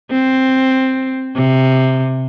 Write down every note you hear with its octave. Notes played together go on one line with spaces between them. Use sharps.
C4
C3